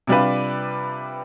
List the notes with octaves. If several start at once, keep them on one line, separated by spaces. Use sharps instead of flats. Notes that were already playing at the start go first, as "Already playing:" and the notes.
C3 G3 D4 F4 B4